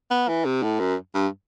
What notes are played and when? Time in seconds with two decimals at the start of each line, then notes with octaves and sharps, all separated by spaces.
0.11 B3
0.28 E3
0.45 C3
0.63 A2
0.80 F#2
1.15 G2